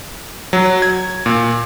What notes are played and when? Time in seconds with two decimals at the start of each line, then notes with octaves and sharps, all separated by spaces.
0.53 F#3
0.82 G#6
1.26 A#2